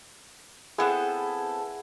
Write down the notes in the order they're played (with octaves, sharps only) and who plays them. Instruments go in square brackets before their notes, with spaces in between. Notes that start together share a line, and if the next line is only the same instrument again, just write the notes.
[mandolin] B3 C4 A4 [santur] E4 [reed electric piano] G#4 F#5